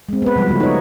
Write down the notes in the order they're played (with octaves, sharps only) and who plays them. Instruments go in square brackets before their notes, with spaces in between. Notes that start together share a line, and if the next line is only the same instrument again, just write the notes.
[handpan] G#3 C4
B3 B4
C3 F3 G3
C#3 A3 F#4
D#4 C#5